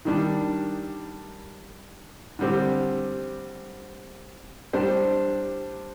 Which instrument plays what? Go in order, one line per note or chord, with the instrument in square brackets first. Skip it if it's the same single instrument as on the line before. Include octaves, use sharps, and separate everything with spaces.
[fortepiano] D#3 G3 D4
D3 G3 C4 G4
G3 D4 G4 C5